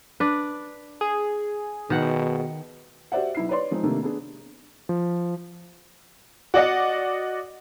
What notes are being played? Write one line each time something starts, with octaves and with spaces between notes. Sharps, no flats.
D4 B4
G#4
B2 D#3 F#5
F#4 G4 C5 D5 E5 F#5
B1 E4 C7
B4 C#5 D5 C6
F3 G#3 C4 D#4
C3 D#3 A3 A#3 D4
B3 D4 G#4
F3
F#4 D5 D#5 F#5